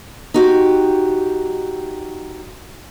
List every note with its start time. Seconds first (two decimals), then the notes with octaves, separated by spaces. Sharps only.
0.34 D#4 F#4 G4